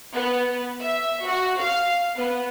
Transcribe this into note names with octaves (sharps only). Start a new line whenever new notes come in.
B3
E5
F#4
F5
B3